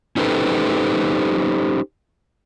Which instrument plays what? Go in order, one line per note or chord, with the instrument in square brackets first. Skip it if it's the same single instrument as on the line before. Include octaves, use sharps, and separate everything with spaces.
[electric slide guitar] C#4 D#4 G4 A4 B4 C5